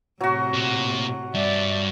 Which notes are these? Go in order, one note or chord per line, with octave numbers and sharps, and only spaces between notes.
A2 C3 F#3 F#4
A#2
G2 D5 E5